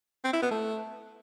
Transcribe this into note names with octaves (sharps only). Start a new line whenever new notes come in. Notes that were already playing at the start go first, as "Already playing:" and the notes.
C4
E4
B3
A3